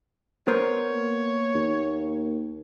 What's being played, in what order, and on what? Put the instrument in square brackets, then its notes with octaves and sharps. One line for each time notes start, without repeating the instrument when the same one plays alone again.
[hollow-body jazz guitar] B3 A#4 C5 [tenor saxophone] C#5
[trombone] A#3
[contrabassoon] D#2